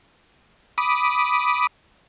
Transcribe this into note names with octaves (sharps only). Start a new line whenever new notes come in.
B5 D6 D#6